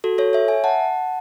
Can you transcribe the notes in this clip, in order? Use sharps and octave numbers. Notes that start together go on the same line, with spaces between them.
F#4 A4
A4 C#5
C#5 E5
E5 G#5
F#5 A5